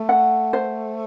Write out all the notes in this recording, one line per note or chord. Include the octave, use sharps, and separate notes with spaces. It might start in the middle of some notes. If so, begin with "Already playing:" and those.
Already playing: A3
F#5
C5